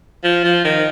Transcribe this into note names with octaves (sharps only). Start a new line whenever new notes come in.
F3
F3
D#3